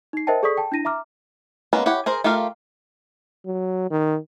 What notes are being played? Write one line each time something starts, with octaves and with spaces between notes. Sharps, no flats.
D#4 C7
A#4 C5 D#5 E5 G5 A5
G#4 A4 D5 C#6 D#6 B6
G5 A5
D4 E4 A#6 D#7
E5 A#5 D6 F6
G#3 A#3 B3 C#4 B4
E4 G4 C#5 F#5
G#4 A#4 C5
A3 F4 G4 A#4 F5
F#3
D#3